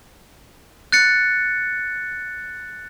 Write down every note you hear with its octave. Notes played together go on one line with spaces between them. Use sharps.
F#6 A6 C#7